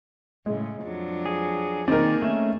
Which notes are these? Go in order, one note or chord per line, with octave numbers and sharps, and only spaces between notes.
A2 C#3 G#3
F2 F#3 D4
G#4
D#3 A#3 C4 D#4 G#4 A#4 D5
A3 C#4 E5